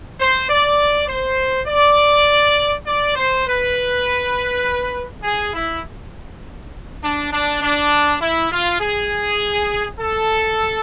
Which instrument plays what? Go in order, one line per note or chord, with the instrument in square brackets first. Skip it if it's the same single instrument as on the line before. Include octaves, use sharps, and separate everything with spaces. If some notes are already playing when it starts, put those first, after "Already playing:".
[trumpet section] C5
D5
C5
D5
D5
C5
B4
G#4
E4
D4
D4
D4
E4
F4
G#4
A4